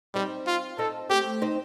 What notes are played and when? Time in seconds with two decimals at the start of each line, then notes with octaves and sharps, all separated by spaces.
0.14 G3 C4 D#4
0.47 F4
0.78 C4 D#4 A4
1.10 A3 C4 G4
1.42 C4 D#4